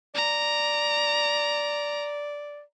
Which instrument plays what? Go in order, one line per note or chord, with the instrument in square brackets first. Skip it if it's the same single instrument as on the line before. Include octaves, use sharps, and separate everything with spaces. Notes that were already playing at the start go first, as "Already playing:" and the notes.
[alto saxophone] D5 [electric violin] A#5